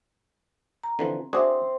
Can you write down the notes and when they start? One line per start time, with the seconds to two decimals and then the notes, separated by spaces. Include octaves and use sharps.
0.83 A#5
0.99 D3 E3 F3 C4
1.33 C4 D4 F#4 G#4 E5 D6 D#6